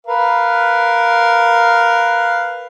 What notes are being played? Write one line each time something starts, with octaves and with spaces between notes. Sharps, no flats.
A#4 B4 F5